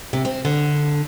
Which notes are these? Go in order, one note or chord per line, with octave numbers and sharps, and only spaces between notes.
C3
C4
D3